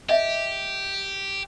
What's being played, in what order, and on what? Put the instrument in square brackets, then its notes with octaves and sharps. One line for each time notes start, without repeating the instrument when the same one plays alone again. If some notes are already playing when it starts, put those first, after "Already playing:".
[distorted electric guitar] G4 [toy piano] D#5 E5